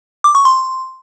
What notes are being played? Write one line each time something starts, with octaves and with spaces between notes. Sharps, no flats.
D6
C#6
C6